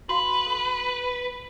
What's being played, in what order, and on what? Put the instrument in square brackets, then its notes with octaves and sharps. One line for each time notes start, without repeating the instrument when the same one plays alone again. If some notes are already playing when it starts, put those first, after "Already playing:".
[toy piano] F#4 F5 C6 [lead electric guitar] B4
[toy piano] A4